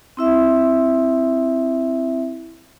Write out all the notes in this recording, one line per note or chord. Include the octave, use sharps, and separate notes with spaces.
C4 E4 E5